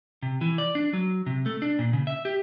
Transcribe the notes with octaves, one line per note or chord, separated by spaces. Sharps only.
C3
E3
D5
D4
F#3
C3
A3
D4
A#2
C#3
E5
G4